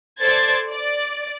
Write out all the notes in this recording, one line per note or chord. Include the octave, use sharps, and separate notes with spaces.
A4 C5 D5 G#6 A6
D5